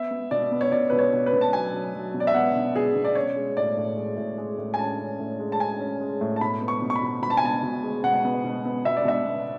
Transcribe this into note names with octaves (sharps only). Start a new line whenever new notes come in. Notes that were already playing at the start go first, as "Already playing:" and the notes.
Already playing: B3 E5
B3
B2 D5
B3
C#5
B2 D5
B2 B4
C#5
B2
B4
B2
A5
F#3 G#5
F#3
F#3
B2
D5
E5
B3 F#5
B2
B2 G#4
B2
D5
C#4 C#5
G#3
A2 D5
A2
G#3
A2
G#3
A2
G#5
C#4 A5
C#4
A2
G#3
A5
C#4 G#5
C#4
G#3
A2
A5
B2 B5
B3
C#6
B2
C#6
B5
B2
B2 B5
A5
G#5
B2 A5
B2
G#3
B2 F#5
B3
B2
B3
B2 E5
D5
B2 E5
B3